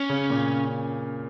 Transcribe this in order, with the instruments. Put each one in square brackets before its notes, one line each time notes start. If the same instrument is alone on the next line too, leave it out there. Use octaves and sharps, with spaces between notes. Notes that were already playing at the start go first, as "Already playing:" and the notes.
Already playing: [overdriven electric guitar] C#4
[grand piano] C#3
A#2